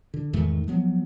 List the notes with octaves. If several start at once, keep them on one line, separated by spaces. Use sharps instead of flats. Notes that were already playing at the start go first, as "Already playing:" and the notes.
D3
E2 G#2 D#3 A3
F3 F#3 B3